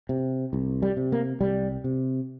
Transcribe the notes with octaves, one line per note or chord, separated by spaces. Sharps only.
C3
C2
G3
C3
A#3
C2 G3
C3